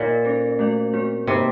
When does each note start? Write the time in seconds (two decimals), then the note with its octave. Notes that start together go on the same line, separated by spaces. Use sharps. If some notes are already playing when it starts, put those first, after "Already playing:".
Already playing: A#2 D#4 A#4 D#5
0.24 C#4 A4 C5
0.59 A3 C#4 F#4 C5 F5
0.93 C4 F#4 C5
1.27 C3 A#3 D#4 A4 D#5